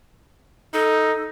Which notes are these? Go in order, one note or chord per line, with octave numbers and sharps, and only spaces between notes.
D#4 A4